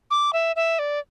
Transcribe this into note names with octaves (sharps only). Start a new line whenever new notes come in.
D6
E5
E5
D5